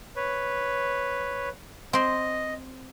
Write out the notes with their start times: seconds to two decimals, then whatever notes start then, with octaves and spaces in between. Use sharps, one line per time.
0.16 B4 C#5
1.93 C4 D#5 C6